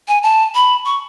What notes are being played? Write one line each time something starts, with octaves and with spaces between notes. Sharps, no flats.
G#5
A5
B5
C#6